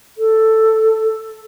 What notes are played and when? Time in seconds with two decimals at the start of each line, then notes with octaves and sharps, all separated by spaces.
0.18 A4